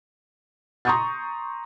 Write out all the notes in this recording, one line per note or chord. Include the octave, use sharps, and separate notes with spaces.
A#5 C6 C#6 D#6 G6 A6